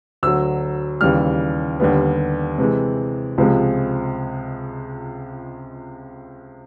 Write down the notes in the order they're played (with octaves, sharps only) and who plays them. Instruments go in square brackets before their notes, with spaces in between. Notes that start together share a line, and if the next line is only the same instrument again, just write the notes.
[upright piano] D2 D3 F#3 E6
D#2 C#3 E3 G3 F6
D#2 D3 G3 B3
C3 E3 G#3
C#2 C3 F3 G#3